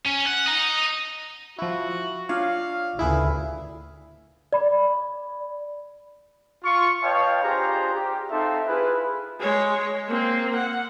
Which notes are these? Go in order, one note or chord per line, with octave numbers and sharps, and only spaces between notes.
C#4
F#5
D#5 A#5
F3 E4 F#4
D4 F4 C#5 F5
G#1 D2 C#3 E4 G#4 B4
D5 B5
F4 C#6
B4 C#5 D#5 F5 G5 A5
D4 F4 G4 G#4 C5 A#5
G4
C4 D#4 A4 E5 F5 C6
E4 F4 G#4 B4
G#3 C#5
A#3 C4
F#5